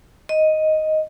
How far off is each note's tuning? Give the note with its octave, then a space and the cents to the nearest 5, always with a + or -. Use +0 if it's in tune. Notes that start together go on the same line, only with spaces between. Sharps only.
D#5 +5